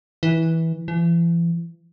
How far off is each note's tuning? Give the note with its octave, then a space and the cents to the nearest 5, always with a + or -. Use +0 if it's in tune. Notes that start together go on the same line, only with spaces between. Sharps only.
E3 -15
E3 +40